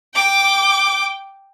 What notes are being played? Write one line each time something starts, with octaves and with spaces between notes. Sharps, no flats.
G5 D6